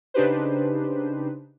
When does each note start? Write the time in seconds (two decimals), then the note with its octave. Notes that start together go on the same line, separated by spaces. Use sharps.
0.14 C#3 D4 D#4 G4 B4 C5